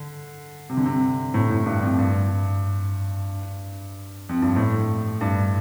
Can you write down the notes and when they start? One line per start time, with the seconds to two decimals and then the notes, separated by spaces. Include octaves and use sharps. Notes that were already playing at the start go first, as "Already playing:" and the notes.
Already playing: D3
0.70 C3
0.77 D3
0.85 C3
1.34 A2
1.50 A2
1.66 G2
1.82 F2
1.98 G2
4.29 F2
4.42 G2
4.56 A2
5.21 G2